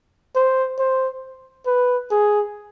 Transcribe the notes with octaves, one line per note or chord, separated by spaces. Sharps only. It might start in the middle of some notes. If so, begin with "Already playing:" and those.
C5
C5
B4
G#4